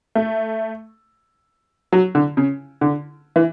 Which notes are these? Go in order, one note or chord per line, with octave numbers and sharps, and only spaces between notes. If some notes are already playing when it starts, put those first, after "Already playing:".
A3
F#3
D3
C#3
D3
E3